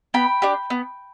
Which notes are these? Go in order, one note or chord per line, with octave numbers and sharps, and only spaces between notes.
B3 G5 B5
D4 G4
B3